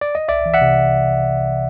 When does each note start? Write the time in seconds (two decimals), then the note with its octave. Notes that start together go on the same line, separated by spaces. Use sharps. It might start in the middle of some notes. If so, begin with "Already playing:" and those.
0.01 D5
0.15 D#5
0.28 C2 D5 E5
0.46 E3
0.54 E5 F#5
0.61 C3